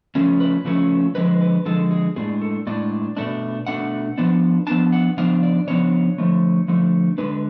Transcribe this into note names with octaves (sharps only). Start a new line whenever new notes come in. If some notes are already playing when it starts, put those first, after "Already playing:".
C#3 F3 A3 C#4
B4
C#3 F3 A3 C#4
D3 F3 G#3 B4
B4
D3 F3 G#3 A4
G#4
A2 G#3 D4 G#4
A4
A2 G#3 D4 D5
B2 A3 D4
B2 A3 D4 F#5
F3 B3 D4
F3 B3 D4 A5
F#5
C#3 F3 B3 D4 F5
D5
C#3 F3 B3 D4 C#5
D3 F3 A3
D3 F3 A3
D3 G#3 D4 B4